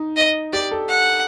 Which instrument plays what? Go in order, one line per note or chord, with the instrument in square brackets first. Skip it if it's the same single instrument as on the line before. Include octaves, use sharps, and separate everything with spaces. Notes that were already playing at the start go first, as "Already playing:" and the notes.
Already playing: [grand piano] D#4
[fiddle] D#5
[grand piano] G4 [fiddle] D5
[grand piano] A4
[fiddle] F#5